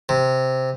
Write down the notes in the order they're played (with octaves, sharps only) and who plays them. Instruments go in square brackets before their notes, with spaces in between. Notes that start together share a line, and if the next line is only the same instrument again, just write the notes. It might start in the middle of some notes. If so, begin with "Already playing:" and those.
[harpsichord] C3